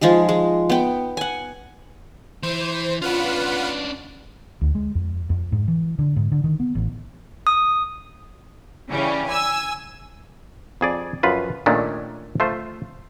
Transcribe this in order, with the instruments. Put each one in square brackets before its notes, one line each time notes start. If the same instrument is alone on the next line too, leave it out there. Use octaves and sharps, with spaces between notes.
[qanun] F3 G#3 D#4 G#4
G#3
B3 G5
F#5 G#5
[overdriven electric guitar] E3 [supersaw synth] C5
[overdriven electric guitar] C#4 D4 [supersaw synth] F4 B4 F#5
[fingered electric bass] D2
G#3
F2
F2
G#2
E3
D3
G#2
D3
D#3
B3
A1
[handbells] D#6
[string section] C#3 E3 G3 C#4
G#5 E6
[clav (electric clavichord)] F2 G#4 D5
F#2 F3 F4 B4
A#2 D#3 A3 C#4 D4 G#4
A3 F4 C5